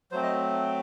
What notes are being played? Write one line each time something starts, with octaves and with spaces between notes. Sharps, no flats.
F#3 A3 C4 C5
D#5